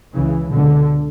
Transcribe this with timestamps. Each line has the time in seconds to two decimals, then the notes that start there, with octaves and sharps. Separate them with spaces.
0.14 C#2 C#3 E3
0.51 C#2 B2 D3